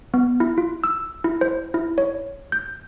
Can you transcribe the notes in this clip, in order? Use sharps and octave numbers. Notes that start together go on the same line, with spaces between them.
B3
E4
F4
E6
E4
C5
E4
C#5
G6